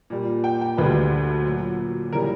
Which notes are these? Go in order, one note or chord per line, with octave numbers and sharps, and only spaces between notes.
A#2 G3
G5
G5
D2 D3 G3 B4
A#2 F#3
C#3 E3 G3 A#4